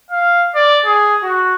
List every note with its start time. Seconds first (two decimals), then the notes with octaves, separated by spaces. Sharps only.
0.11 F5
0.55 D5
0.86 G#4
1.23 F#4